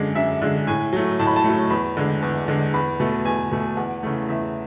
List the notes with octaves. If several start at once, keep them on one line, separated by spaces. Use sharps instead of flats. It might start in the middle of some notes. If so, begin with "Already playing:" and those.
Already playing: F#2 D3 G#3
F#2 E5
D3 G#3
A2 G#5
F#3 A3
A2 A5
B5
A5
A3
F#3
E2 B5
D3 G#3
E2
D3 G#3
E2 B5
B2 A3
E2 G#5
B2 A3
E2 F#5
C#3 E3 A3
E2 E5